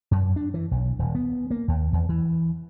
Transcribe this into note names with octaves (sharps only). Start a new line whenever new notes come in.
F#2
D4
E3
B1
D#1
B3
A#3
D#2
E2
E3